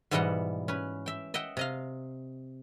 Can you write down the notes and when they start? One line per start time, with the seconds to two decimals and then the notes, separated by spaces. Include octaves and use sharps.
0.11 G#2 B2 E3 G3 D#5 F#5
0.68 C#4 B4
1.06 E5 G5
1.34 D#5 E5 F#5 G5
1.57 C3 D#5 F5